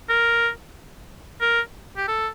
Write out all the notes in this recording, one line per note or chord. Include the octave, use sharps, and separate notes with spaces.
A#4
A#4
G4
A4